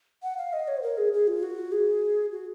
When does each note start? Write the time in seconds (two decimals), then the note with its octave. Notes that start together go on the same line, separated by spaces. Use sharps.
0.23 F#5
0.37 F5
0.53 D#5
0.68 C#5
0.77 C5
0.82 A#4
0.98 G#4
1.13 G#4
1.28 F4
1.43 F#4
1.72 G#4
2.32 F#4